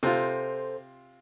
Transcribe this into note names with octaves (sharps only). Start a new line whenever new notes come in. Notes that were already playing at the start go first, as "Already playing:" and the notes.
C3 F4 A4 C5